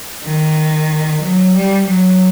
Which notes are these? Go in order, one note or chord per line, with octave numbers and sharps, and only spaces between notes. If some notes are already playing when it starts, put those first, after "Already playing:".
D#3
F#3
G3
F#3